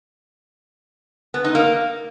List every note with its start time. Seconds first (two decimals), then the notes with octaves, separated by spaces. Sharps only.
1.34 B3
1.44 D#4
1.55 A#3